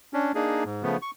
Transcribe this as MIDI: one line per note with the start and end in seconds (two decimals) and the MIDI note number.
0.13 0.32 61
0.13 0.32 62
0.35 0.64 58
0.35 0.64 62
0.35 0.64 63
0.35 0.64 68
0.65 0.83 44
0.83 0.97 49
0.83 0.97 53
0.83 0.97 57
0.83 0.97 59
1.02 1.11 85